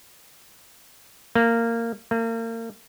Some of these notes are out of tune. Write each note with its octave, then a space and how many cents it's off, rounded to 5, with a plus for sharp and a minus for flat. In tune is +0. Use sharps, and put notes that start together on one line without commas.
A#3 -15
A#3 -35